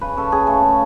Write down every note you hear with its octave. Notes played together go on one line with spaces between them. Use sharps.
C#3 B4
C#4 A4
C#3 G#4
A3 A4
C#3